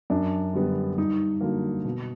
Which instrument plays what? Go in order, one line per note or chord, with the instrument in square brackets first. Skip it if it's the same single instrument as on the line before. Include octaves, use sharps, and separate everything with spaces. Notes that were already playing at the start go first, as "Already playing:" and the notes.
[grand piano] F#2 D4
D3 G3 B3
G2 D#4
D3 F#3 A#3
B2